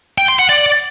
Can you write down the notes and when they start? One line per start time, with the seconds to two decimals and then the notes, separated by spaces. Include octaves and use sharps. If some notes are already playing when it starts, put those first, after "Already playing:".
0.18 G5
0.28 C6
0.39 F#5
0.49 D5